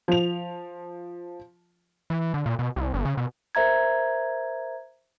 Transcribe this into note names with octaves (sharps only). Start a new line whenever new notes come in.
F3 F7
E3
D3
A#2
B2
C2
G1
C#3
B2
A#4 C5 E5 A#5 G#6